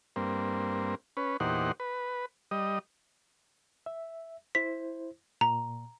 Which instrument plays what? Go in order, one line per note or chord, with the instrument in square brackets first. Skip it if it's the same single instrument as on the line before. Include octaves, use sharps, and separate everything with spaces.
[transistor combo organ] G2 A#3 C4
C#4 B4
E2 A#2 D#4 G4 C5 F#5
B4
G3 D#5
[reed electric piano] E5
[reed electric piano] E4 C5 [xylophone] B6
[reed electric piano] A#2 [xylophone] A#5